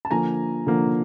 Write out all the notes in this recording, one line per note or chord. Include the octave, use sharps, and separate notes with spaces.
A5
D3 F3 A#3 G#5 A#5
D3 F3 A#3